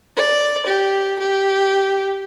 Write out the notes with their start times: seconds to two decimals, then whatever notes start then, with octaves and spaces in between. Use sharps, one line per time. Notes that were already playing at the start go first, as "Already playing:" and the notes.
0.16 D5
0.66 G4
1.19 G4